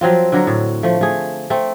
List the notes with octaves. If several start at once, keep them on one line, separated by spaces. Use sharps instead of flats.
F3 F#3 C4 F4
D3 F#3 A#4
A2
F3 A3
A3 G#4
A3 C4